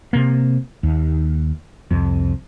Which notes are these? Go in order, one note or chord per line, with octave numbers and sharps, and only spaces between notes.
C3 A#3
D#2
C2 F2